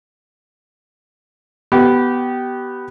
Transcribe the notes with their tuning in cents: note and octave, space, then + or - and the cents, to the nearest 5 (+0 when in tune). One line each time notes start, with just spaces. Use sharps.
B3 +0 G4 -20